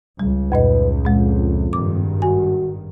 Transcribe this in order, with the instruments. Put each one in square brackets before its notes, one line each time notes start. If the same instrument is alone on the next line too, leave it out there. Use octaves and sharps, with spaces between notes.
[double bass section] C#2 [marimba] G3
[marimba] F2 A#2 D#5 [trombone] B4
[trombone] F2 [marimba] A#2 G#3
[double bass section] G#1 G2 D#3 [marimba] D6
[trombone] F#4 [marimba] G#5